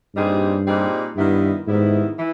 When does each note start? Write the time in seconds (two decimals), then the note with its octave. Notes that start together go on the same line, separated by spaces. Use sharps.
0.15 G2 A#2 G3 C4 D#4 G#4
0.66 A#2 G3 C4 D#4 G#4
1.16 G2 D#3 G3 B3 E4
1.67 G#2 D#3 G3 B3 E4
2.18 E3